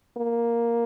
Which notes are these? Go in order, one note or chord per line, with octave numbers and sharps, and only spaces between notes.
A#3